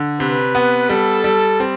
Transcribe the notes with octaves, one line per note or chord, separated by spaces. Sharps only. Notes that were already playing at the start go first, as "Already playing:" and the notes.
Already playing: D3
C3 B4
B3
G3 A4
G3
C4